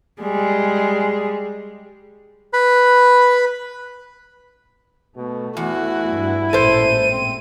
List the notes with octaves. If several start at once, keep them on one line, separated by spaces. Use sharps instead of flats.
G3 G#3 G#4
B4 B5
B2 A3
E2 E4 F#4
G2
A1 A#2 G#3 A4 C5 D#7
C4